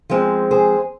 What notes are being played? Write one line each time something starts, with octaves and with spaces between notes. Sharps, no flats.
F3 G#3 C4
G#4 C5